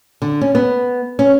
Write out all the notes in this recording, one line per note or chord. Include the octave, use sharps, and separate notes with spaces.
D3
C#4
B3
C#4